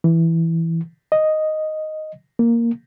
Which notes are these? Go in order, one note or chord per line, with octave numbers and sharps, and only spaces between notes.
E3
D#5
A#3